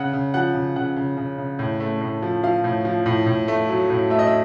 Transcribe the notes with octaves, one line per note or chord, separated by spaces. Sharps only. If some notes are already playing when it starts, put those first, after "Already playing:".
Already playing: C#3 F#5
C#3
F3 F#5
C#3
C#3 F#5
C#3
C#3
C#3
A2
A3
A2
F3
F3 F5
A2
F3
A2
A2
A3
F#3
A2
A3 E5
D#5
E5